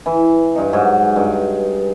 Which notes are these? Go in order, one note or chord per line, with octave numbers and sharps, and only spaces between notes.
E3
G2 D#4
G#2 F#3
G2